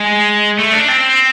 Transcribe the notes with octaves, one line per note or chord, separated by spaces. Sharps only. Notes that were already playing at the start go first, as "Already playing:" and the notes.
Already playing: G#3
A3
D4
C4